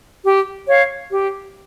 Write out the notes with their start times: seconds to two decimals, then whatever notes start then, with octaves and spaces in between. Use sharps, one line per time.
0.24 G4
0.67 C#5 F5
1.11 G4